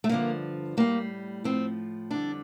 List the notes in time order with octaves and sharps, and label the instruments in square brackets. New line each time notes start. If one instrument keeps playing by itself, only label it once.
[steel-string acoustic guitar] A3
G2 D3 F3 A#3
A2 G3 A#3
A2 F3 C4
F2 D3 G3 D4